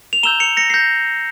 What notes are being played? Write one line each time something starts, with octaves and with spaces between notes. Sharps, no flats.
F7
A#5 E6 G6 E7 G7
C#7 F7
A#6 C#7
C7
G6 A#6